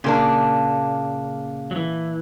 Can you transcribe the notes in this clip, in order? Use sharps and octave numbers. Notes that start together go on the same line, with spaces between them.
A#2 C#3 A#3 D4
F#3
E3